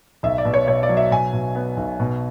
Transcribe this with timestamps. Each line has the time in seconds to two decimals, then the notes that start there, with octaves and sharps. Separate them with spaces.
0.23 B1 E5
0.38 D5
0.45 B2
0.54 C#5
0.67 B2 C#5
0.83 D5
0.89 F#3
0.97 E5
1.11 B2 G#5
1.33 B2
1.55 B3
1.77 B1
2.00 B2